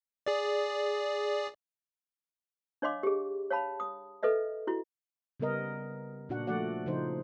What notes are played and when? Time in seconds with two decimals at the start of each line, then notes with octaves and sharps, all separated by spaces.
0.26 G#4 D5
2.82 D4 C#5 D#5 F5 C6 D6
3.03 G4 G#4
3.50 C#5 F5 A5 B5
3.80 D#6
4.23 A4 B4 D#5 E5
4.67 E4 F#4
5.40 C#3 G3 B3 A#4 D#5
6.29 A#2 D4 F#4 F#5
6.47 F3 A3 F#4 D5 F#5
6.86 C#3 F3 D#4 C5